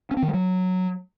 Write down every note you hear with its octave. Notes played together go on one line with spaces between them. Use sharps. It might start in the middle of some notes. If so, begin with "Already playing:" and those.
C#4
C4
D#3
G3
F#3